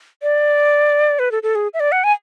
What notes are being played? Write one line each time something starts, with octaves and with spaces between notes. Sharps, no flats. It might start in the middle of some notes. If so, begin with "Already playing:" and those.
D5
B4
A4
A4
G#4
E5
D5
F#5
G#5